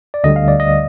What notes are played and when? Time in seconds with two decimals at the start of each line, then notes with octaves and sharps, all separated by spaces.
0.14 D5
0.24 D2 D3 G3 D#5
0.36 F5
0.48 D5
0.60 D#5